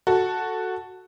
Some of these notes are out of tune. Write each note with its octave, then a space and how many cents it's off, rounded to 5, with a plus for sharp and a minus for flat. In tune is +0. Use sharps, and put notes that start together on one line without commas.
F#4 +0 A4 +0